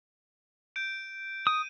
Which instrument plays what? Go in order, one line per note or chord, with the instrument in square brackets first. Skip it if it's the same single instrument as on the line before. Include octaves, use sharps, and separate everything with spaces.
[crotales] G6 D7
[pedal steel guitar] D#6 [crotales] D#7